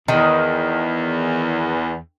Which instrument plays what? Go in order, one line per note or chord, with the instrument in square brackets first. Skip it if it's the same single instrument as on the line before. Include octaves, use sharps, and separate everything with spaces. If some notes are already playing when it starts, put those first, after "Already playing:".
[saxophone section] E2 [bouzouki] D#3